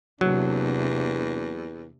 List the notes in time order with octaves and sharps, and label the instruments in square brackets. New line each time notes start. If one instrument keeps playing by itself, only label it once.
[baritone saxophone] E2 [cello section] C3 A#3 D4 [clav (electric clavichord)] F#3